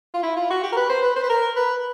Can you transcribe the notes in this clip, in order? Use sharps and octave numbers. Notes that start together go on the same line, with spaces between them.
F4
E4
F4
F#4
G4
A#4
B4
C5
B4
C5
B4
A#4
B4